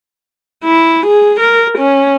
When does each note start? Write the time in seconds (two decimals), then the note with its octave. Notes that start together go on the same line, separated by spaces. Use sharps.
0.64 E4
1.06 G#4
1.40 A#4
1.78 C#4